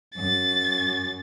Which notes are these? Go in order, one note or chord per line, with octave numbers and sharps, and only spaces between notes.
F#2 A6